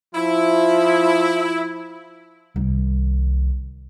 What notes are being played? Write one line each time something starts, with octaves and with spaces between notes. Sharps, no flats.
F3 E4
C2 D#3